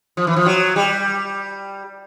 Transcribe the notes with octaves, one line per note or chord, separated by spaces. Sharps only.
F3
E3
F3
F#3
G3